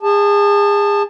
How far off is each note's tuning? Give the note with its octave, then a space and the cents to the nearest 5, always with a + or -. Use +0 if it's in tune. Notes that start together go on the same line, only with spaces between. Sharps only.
G#4 -30 A5 +0